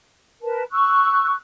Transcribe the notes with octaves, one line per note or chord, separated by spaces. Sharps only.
A#4 B4 A5
C#6 E6 F#6